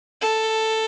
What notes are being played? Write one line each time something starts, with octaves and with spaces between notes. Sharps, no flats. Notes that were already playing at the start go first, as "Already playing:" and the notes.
A4